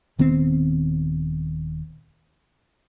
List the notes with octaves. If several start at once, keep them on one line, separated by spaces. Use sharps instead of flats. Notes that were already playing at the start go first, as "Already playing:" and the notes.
D#1 D#3 B3 C4